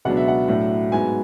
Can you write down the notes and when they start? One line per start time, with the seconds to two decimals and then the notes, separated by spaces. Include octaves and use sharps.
0.05 C#2 B2 F#3 B3 D4 F#5
0.17 E5
0.28 F#5
0.48 A2 F#3 A3 D4
0.92 G#2 F#3 B3 G#5